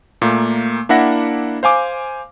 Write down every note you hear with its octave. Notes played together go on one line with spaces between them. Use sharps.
A#2 A3 A#3
A#3 D4 E4 E5 F#5 A#6
C5 F5 G#5 D6